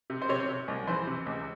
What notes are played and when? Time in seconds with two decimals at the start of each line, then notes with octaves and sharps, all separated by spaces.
0.10 C3
0.22 C5
0.29 C3 C#5
0.49 C3
0.68 C2
0.87 E3 C5
1.07 C3
1.26 C#2